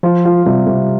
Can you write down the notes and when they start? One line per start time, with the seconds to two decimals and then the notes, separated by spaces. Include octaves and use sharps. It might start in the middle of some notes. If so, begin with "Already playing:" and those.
0.03 F3 F4
0.25 F4
0.46 C3 G3
0.67 C3